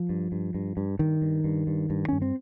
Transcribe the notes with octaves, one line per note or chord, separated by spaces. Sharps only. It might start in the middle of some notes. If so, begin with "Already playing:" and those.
Already playing: F3
G2
G2
G2
G2
G2 D#3
G2
G2
G2
G2
G2 C#4
C4